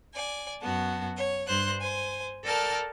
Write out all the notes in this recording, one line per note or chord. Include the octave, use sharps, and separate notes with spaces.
D5 G#5
F#2 B3 F#4 A5
C#5
G2 C5 C6 F#6
C5 G#5
A4 A#4 D5 G5 A5 F6